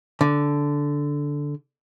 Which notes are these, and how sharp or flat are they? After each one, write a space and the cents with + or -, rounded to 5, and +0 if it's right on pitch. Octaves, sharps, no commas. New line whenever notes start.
D3 -10